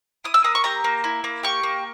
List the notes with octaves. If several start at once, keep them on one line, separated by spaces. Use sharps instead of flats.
E4 D#6
E6
A#3 D#6
C#6
G4 A#5
A#3
E4
A#3
G4 C#6
A#3